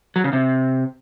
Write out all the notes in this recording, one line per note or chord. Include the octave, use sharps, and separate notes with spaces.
F#3
C#3
C3